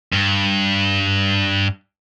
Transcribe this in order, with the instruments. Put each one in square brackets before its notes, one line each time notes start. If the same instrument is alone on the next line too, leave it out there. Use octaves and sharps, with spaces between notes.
[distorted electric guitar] G2